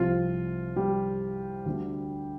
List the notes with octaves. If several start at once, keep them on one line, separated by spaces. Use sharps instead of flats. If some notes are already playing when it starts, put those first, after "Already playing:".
Already playing: C2 C3 F3 C4 F4
G3 G4
D2 D3 G3